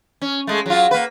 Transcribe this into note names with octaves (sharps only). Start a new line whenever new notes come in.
C#4
G#3 A3
F#3 F4
A#3 B4